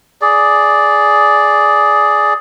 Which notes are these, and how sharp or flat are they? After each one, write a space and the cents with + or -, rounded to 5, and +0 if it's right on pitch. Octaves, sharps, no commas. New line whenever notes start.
G#4 +10 D5 +0